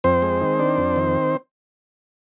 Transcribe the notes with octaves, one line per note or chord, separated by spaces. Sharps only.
F2 C4 C5
G#3
D#3
D4
F2
D#3